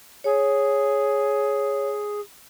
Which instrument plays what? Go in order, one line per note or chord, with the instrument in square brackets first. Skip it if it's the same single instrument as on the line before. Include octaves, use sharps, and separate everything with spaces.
[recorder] G#4 [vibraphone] C#5